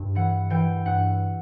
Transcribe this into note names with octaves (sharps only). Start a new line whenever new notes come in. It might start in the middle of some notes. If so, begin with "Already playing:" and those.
Already playing: G2
E3 F#5
E3 G5
G2 F#5